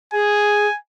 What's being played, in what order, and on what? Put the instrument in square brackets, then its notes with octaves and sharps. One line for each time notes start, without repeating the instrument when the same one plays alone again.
[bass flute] G#4 [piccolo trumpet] G#5